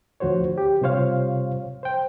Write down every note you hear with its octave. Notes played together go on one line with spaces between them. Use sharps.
D2 F3 F#4 C5 C#5
G4
C3 G3 F4 C5 C#5 F5
C5 G5